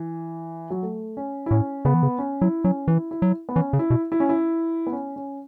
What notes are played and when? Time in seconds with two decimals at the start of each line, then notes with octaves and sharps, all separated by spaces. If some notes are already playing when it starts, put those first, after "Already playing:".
Already playing: E3
0.71 F#3
0.82 A3
1.17 C#4
1.46 E4
1.51 A2 C#4
1.85 C#3 B3
1.94 E3
2.03 C#3
2.19 C#4
2.41 F#3 E4
2.64 F#3 C#4
2.88 E3 E4
3.11 E4
3.22 F#3
3.49 B3
3.55 E3 C#4
3.73 C#3
3.79 E4
3.90 B2
4.12 E4
4.20 C#4
4.29 E4
4.87 B3
4.92 C#4
5.16 C#4